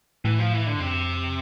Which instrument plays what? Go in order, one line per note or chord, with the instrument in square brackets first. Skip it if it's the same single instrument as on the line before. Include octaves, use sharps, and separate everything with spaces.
[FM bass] A2 [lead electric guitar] E3
[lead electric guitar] F3
E3
D3
[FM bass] G2
[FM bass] F2 [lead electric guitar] C3